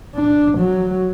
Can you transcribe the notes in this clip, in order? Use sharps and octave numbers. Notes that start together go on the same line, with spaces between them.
D4
F#3